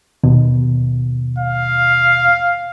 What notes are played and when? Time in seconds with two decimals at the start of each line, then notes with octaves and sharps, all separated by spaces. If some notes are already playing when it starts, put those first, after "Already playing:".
0.24 D#2 B2
1.39 F5